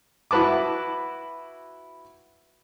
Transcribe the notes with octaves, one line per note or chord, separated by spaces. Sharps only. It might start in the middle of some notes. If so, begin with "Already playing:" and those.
E4 F#4 B4 A5 D6